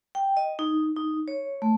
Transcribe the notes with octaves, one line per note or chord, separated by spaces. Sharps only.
G5
D#5
D#4
D#4
C#5
A3